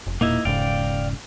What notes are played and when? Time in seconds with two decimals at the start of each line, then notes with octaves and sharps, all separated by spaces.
0.07 F1
0.21 E1 A#2 A#3 D#4 E4
0.45 E1 G#2 C#3 D5 F5 G5